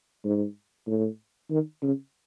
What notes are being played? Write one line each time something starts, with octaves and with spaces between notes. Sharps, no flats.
G#2
A2
D#3
C#3